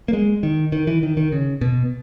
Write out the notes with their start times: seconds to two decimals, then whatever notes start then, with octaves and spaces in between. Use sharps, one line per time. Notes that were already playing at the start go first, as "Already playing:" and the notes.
0.08 A#3
0.13 G#3
0.43 D#3
0.72 D#3
0.87 E3
1.03 D#3
1.17 D#3
1.32 C#3
1.61 B2